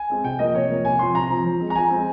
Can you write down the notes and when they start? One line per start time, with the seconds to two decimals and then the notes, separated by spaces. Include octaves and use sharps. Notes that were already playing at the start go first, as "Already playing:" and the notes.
Already playing: G#5
0.10 G#3 C4
0.24 C3 G5
0.39 F3 A#3 D#5
0.54 C3 C#5
0.70 F3 A#3
0.85 C3 G#5
0.99 F3 C4 C6
1.15 C3 A#5
1.30 F3 C4
1.45 F3
1.60 G#3 C4
1.70 A#5
1.75 F3 G#5
1.90 G#3 C4